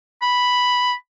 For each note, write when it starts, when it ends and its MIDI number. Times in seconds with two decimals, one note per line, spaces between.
0.22 0.94 83